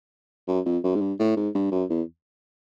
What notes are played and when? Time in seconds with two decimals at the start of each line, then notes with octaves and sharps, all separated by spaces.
0.48 F#2
0.65 F2
0.83 F#2
0.96 G#2
1.01 G2
1.19 A2
1.36 G#2
1.54 G2
1.72 F#2
1.90 E2